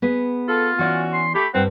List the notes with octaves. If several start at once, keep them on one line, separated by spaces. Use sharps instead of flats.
B3 G#4 B4
F4 A4
E3 C#4 F#4 D5
C6
A3 G4 B5
G2 G3 C4 F#5